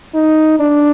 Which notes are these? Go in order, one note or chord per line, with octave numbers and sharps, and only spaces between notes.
D#4
D4